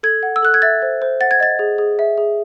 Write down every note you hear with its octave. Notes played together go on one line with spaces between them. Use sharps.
A4 G#6
F#5
E6
A4 F#6
G#6
E5 A6
C5
C5
F#5 A6
G#6
D#5 A6
G#4
G#4
E5
G#4